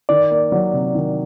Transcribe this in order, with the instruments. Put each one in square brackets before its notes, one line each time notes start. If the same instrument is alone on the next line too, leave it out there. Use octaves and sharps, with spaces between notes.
[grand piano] D#3 [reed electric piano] D5
[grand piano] A#3
F#3
C3
D#3